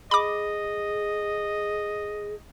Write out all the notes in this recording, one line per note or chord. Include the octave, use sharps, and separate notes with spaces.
G#4 D#5 B5 D6